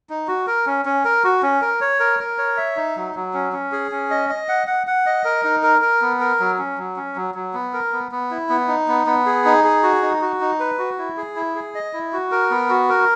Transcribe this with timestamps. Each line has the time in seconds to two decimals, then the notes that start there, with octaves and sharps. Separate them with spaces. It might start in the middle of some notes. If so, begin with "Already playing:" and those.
0.10 D#4
0.28 F#4
0.47 A#4
0.66 C#4
0.85 C#4
1.05 A#4
1.24 F#4
1.43 C#4
1.62 A#4
1.81 C#5
2.00 A#4
2.19 A#4
2.38 C#5
2.57 E5
2.77 D#4
2.96 F#3
3.15 F#3
3.33 C#4
3.53 C#4
3.72 G#4
3.91 C#4
4.11 D#5
4.29 D#5
4.49 F#5
4.67 F#5
4.87 F#5
5.06 D#5
5.25 A#4
5.44 D#4
5.63 A#4
5.82 A#4
6.02 B3
6.20 A#4
6.40 F#3
6.58 C#4
6.78 F#3
6.96 C#4
7.16 F#3
7.35 F#3
7.54 B3
7.74 A#4
7.92 B3
8.12 B3
8.31 E4
8.49 B3
8.68 D#4
8.88 B3
9.06 B3
9.26 G#4
9.45 D#4
9.64 G#4
9.83 F#4
10.02 D#4
10.21 F#4
10.41 D#4
10.60 B4
10.79 F#4
10.98 E4
11.17 G#4
11.36 E4
11.55 G#4
11.75 D#5
11.93 E4
12.13 F#4
12.32 A#4
12.51 B3
12.69 F#4
12.89 A#4